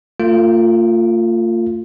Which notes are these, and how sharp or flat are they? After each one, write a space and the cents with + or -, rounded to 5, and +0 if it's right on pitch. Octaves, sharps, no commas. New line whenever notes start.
A3 +45 F4 +0